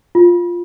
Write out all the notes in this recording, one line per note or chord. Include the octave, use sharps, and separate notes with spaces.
F4